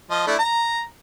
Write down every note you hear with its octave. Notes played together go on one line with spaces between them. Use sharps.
F3 D#5
A3 D4 E4
A#5